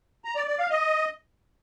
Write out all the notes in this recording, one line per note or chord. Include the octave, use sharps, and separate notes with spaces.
A#5
D5
D5
F5
D#5